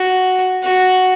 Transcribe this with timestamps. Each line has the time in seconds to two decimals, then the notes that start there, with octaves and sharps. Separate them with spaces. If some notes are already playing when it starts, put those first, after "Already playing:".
Already playing: F#4
0.64 F#4